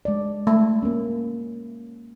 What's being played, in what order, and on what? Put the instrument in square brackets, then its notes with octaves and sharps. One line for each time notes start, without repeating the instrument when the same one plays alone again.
[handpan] G#3 D5
[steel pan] A3
[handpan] A#3 C#4